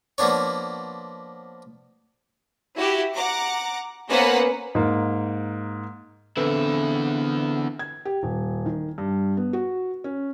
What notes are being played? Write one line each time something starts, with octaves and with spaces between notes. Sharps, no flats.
F3 A#3 B3 D4 C#5
E4 F#4 G4
F#5 A#5 D6
A#3 B3 C#4 B4 C5 F#5
G#2 A#3
E2 D3 C4 E4 A4 B4 E6
G#6
G4
D#1
D#3
G2
B3
F#4
C#4